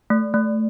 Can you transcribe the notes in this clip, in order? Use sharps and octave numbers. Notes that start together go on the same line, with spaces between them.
A3
A3